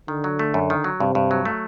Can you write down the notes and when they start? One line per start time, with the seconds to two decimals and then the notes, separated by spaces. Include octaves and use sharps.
0.08 D3 D#3
0.24 F#3
0.39 A3
0.54 F#2
0.70 D#3
0.84 F#3
1.00 G2 C3
1.15 G2
1.31 F#3
1.45 A3